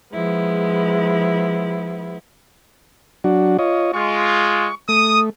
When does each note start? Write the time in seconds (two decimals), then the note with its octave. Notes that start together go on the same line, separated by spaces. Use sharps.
0.13 F3 G#3 B3 E4
3.24 F#3 D4 F#4
3.59 F4 C#5 D#5
3.94 G#3 F4 C#6
4.89 A3 D#6